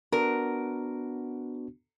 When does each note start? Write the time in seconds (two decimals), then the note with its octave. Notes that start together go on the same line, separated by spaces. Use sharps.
0.12 B3 D4 F#4 A#4